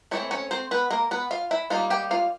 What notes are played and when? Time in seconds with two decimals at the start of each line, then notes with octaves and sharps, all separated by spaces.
0.11 E3 A3 C4 C#5
0.31 C#4 C#5
0.51 C4 C5
0.71 B3 B4
0.91 A#3 A#4
1.11 B3 B4
1.31 F4 F5
1.51 E4 E5
1.70 G3 A#3 D#4 F4 F5
1.90 G4 G5
2.11 F4 F5